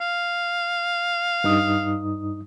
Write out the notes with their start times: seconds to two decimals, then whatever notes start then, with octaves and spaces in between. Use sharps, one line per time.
0.01 F5
1.44 G2 D#4 D#6